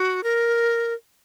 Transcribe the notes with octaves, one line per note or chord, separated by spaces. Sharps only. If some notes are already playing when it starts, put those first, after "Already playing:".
Already playing: F#4
A#4